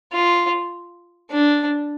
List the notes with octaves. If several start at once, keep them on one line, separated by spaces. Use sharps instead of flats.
F4
D4